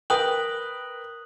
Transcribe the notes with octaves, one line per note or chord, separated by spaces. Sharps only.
A#4 B4 G5 D#6 F#6 F#7